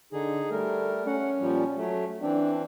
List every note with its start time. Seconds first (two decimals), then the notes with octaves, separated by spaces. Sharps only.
0.13 D3 D#4 G#4
0.51 G3 A3 A#4
1.07 C#4 F#5
1.40 A#2 F3 G3
1.76 F#3 A3
2.21 E3 C4 D4